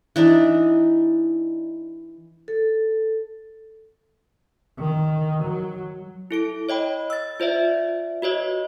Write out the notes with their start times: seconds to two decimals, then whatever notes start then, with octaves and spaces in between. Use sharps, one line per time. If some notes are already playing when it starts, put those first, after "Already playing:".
0.16 E3 D4 D#4 D5
2.48 A4
4.78 D#3
5.43 F#3
6.31 E4 A4 D7
6.69 C#5 D#5 G5 B5
7.10 E6 A6
7.40 F4 C5 D5 E5
8.22 F#4 B4 C#5 D#5